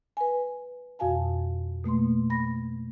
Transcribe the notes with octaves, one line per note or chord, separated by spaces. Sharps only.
B4 G#5
F2 B2 F#4 F5 G#5 A5
B2 A3 A#3 C6
B5 A#6